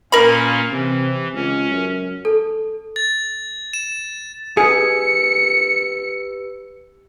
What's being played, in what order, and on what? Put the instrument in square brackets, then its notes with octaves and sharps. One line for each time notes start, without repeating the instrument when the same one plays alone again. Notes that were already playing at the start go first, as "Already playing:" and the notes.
[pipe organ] A#2 A#3 C#4 [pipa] A#4 B5
[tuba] C3 [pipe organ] E3
[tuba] C#2 [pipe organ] C#4
[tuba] F#2
[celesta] A4
[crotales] A6
E7
[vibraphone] G4 B4 E6 [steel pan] G#4 [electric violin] C#7